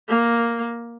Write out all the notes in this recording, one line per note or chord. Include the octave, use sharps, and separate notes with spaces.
A#3